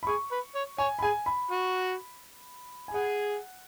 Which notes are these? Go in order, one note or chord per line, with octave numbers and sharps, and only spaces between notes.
B5
G#4 C#6
B4
C#5
C#5 G#5
B5
G#4 G#5
B5
F#4
G#5
G#4 F#5